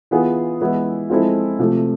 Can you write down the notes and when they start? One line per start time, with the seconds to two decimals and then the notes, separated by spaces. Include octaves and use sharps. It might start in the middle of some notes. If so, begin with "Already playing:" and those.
0.11 E3 B3 F4 G#4
0.61 E3 G#3 B3 E4
1.10 F3 G#3 C4 E4 A4
1.59 C3 F3 A3